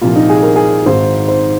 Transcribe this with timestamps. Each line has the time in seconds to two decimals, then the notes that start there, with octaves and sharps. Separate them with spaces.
0.02 C2 A#2 F3 F4
0.16 D#4
0.29 G#4
0.43 A#4
0.56 G#4
0.86 G#1 G#2 D#3 C5
1.28 C5